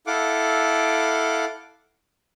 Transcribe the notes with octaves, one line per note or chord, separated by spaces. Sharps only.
E4 A4 F5 F#5 D6